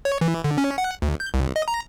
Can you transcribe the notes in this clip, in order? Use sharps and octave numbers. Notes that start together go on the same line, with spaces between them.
C#5
E3
D3
C#4
F#5
D2
G6
C2
D#5
A#5